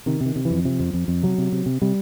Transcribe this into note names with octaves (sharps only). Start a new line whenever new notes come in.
C3 D#3
C3 D#3
C3
E3
F2
C3 F3
F2
F2
F2
C3 F#3
C3
C3
C3
C3 G3